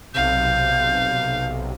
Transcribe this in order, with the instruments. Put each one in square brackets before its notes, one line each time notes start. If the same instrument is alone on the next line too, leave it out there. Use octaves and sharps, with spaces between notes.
[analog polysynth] B1 C3 [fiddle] F5 [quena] G6